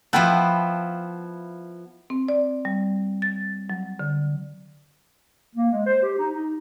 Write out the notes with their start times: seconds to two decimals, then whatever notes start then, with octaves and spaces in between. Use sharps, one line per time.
0.13 F3 B3 E4 F#5 G5 A5
2.10 C4
2.28 D5
2.65 G3
3.22 A6
3.70 F#3
3.99 D3
5.54 A#3
5.72 G#3
5.85 C5
6.03 G4
6.18 D#4
6.35 D#4